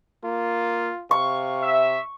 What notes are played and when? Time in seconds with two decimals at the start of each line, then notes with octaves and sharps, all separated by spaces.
0.24 A#3 F4
1.11 C3 F5 C#6
1.62 E5